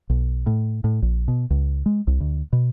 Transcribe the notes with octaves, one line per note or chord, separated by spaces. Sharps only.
B1
A2
A2
A#1
B2
C#2
G#3
C2
D2
B2